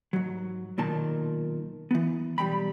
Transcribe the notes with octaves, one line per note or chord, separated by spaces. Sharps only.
G#2 F#3
B1 A#2 D#3 A5
E3 B3
B1 G3 G#3 G5 B5